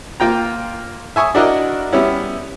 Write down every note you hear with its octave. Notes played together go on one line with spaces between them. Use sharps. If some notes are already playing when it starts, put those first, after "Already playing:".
A#3 F4 G5 A#5
E5 G#5 C#6 D#6
D4 E4 F#4 A#4 D5 D#5
G3 B3 C#4 E4